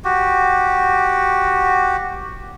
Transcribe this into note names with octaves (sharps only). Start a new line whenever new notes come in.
F#4 G4